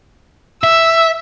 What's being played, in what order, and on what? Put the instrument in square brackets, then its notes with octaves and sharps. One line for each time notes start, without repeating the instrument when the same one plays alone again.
[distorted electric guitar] E5 [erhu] E6